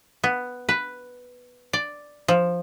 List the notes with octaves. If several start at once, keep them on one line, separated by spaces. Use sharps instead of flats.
B3
B4
D5
F3